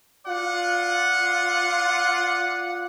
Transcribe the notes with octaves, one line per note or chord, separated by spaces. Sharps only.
F4 D5 F#5